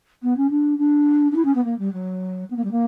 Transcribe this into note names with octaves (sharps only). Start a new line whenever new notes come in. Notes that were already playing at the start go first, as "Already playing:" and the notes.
B3
C#4
D4
D4
D4
E4
C#4
B3
A#3
G3
F#3
B3
A#3
G3
A#3